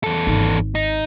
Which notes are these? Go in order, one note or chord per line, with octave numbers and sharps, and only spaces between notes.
E2 A4
G#1
D#4